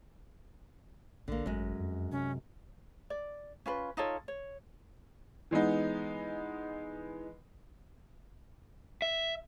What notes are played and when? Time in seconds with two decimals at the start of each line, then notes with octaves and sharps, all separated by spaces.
1.28 A#1 D3 A#3
1.46 G#1 F#2 G#3
1.80 F2
2.12 C3 C#4
3.10 D5
3.66 C#4 F4 B4
3.97 D#4 F4 A4 C#5
4.28 C#5
5.51 E3 G#3 B3 D#4
9.02 E5